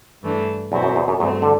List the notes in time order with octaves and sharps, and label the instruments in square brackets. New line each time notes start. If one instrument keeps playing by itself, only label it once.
[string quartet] G2 E3 A3 D4
[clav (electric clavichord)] E2 [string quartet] B2 F#3 C4 E4
[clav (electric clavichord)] F#2
E2
F#2
[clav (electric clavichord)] E2 [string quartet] G2 F#3 A3 C4
[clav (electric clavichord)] D3